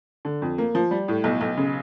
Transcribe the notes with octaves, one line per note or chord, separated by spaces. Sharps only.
D3
F2
A#3
F3
G3
A2
B1
B1
C#3